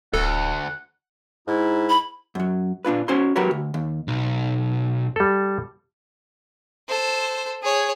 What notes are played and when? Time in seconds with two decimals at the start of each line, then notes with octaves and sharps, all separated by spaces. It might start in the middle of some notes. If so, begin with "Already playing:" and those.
0.14 D1 D2 A4 F#5
1.48 G#2 D#4 E4
1.89 B5
2.35 F#2 F#3
2.85 A#2 D4 F4 B4
3.08 C#4 F#4 C5 C#5 G#5 C6
3.36 F#3 F#4 G4 A#4 B4 C#5
3.51 D2
3.74 D#2
4.08 B1
5.16 G3 A4
6.88 A4 C5
7.63 G#4 C#5